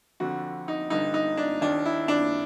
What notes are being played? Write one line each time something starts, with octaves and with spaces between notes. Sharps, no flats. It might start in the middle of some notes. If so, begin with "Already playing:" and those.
F2 D3 F#4
D#4
G2 D3 D#4
D#4
D4
D#2 D#3 D4
E4
D4